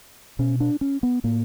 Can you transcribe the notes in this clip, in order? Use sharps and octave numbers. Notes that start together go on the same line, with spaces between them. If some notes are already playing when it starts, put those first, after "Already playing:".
B2 C#4
D4
C#4
B3
A2 A#3